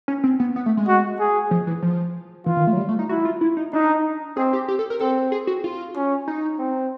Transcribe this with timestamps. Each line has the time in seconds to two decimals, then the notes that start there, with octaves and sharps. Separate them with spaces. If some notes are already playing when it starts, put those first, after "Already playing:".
0.08 C#4
0.24 C4
0.40 B3
0.56 B3
0.66 A3
0.77 G#3
0.87 F#4
1.20 G#4
1.51 F3
1.67 E3
1.82 F3
2.46 E3 F4
2.57 D#3
2.67 A3
2.73 F#3
2.78 G3
2.89 A3
2.99 D#4
3.09 E4 F#4
3.25 F4
3.41 E4
3.57 D#4
3.73 D4 D#4
4.37 C4 G#4
4.53 G4
4.68 G4
4.79 A4
4.90 A#4
5.00 C4 A4
5.32 G#4
5.47 F#4
5.64 F4
5.96 C#4
6.28 D#4
6.59 C4